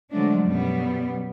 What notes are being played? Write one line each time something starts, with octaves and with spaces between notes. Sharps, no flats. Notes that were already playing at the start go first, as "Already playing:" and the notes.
D3 F3 F#3 G#3 A3 D4
F#2 B2 G3 B3